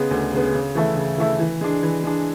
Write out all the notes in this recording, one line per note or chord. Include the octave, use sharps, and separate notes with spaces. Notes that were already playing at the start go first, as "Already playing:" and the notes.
Already playing: C#3 G#3 B3
D2
C#3 G#3 B3
C#3
E3 A3 E4
C#3
E3 A3 E4
E3
G#3 D4
E3
G#3 D4